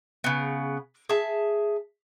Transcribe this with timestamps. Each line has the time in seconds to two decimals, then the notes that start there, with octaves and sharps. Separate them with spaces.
0.24 C#3 B3
1.09 G#4 E5 A5